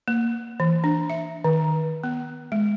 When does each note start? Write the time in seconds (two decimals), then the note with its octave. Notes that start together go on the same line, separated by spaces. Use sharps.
0.08 A#3
0.60 E3
0.84 D4
1.10 E5
1.44 D#3
2.04 B3
2.52 G#3